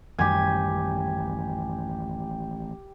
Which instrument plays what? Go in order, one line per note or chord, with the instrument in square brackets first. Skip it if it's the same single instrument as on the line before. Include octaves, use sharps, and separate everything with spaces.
[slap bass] A1 D#3 G3 [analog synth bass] F#2 [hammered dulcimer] G4 G#5